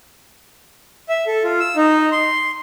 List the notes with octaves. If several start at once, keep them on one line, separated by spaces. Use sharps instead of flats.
E5
A4
F4
E6
D#4
C6